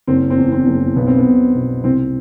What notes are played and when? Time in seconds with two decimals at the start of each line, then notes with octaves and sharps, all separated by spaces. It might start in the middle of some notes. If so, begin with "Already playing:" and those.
0.08 F#1 C4
0.30 C4
0.38 E2
0.52 C4
0.67 F#1
0.96 B1 B3
1.07 C4
1.18 B3
1.26 B2
1.55 B2
1.84 C2 C4